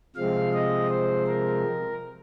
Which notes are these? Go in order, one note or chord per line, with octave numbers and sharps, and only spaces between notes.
C3 F3 G#3 C4 F5
D#5
C5
A#4